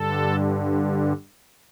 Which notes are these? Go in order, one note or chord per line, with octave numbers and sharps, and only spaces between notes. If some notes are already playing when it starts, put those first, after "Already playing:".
Already playing: G2 D3 A4